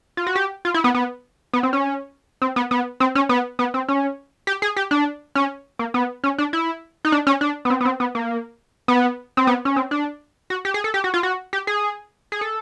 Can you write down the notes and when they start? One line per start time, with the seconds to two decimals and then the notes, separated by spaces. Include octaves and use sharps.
0.17 F4
0.27 F#4
0.35 G4
0.65 F4
0.74 E4
0.84 B3
0.95 B3
1.53 B3
1.63 C4
1.73 C#4
2.42 C4
2.56 B3
2.71 B3
3.00 C4
3.15 C#4
3.29 B3
3.59 B3
3.74 C4
3.88 C#4
4.47 G4
4.62 G#4
4.76 G4
4.91 D4
5.35 C#4
5.79 A#3
5.94 B3
6.24 C#4
6.38 D4
6.53 E4
7.05 D#4
7.12 D4
7.27 C#4
7.41 D4
7.65 B3
7.70 C4
7.81 B3
7.85 C4
8.00 B3
8.15 A#3
8.88 B3
9.37 C4
9.47 B3
9.65 C#4
9.76 C4
9.91 D4
10.50 F#4
10.65 G4
10.74 G#4
10.84 A4
10.94 G4
11.04 F#4
11.14 F4
11.23 F#4
11.53 G4
11.67 G#4
12.32 G#4
12.41 A4